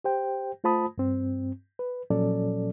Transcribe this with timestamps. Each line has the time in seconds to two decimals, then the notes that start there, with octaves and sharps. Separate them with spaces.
0.04 G4 C5 G5
0.64 A3 F4 C5 A5 B5 D#6
0.98 G2 C4
1.79 B4
2.10 A#2 F3 F#3 C#4 A4 D5